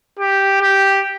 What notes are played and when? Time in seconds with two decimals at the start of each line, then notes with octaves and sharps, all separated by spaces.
0.19 G4
0.61 G4